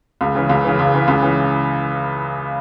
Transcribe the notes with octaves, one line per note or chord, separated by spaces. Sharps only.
C#2
C#3 E3
C#2
C#3 E3
C#2
C#3 E3
C#2
C#3 E3